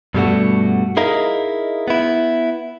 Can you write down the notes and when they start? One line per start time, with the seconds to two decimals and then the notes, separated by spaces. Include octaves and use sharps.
0.14 G2 B2 G3 A3 D4 F#4
0.97 D#4 E4 G#4 A#4 D#5 F5
1.88 B3 E4